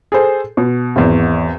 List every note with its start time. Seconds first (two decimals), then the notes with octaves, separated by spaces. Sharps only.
0.12 G#4 A4 C5
0.57 B2
0.96 G#1 E2